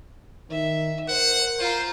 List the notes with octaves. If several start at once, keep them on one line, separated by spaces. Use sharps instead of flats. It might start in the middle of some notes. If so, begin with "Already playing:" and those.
D#3 E5
A#4 C5 F#5
F4 C5 A#5